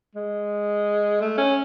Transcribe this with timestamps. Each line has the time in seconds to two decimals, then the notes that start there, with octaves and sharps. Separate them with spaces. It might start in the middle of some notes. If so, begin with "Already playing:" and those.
0.15 G#3
1.21 A3
1.38 C#4